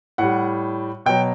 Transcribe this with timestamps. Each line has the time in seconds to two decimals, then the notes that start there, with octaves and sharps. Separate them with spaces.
0.18 A2 G3 F#5
1.06 B2 F#3 G5